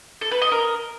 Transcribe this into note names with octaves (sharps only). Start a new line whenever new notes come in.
A4
B4
D#5
A#4